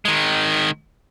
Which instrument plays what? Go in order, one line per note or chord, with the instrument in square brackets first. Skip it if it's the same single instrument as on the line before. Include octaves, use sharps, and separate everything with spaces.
[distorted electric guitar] D#3 G#3